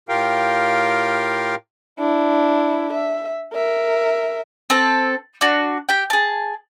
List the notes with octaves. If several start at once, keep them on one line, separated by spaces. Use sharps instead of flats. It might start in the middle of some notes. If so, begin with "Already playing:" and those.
A2 F4 G4 A#4 F5 G5
D4 E4
E5
A#4 E5
C4 A4 A5
D4 F#4
G4 G5
G#4 A5